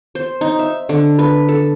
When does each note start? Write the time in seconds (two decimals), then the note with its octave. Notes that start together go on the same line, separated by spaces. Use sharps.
0.15 C5
0.41 D#4
0.59 E5
0.89 D3
1.19 B4
1.49 A4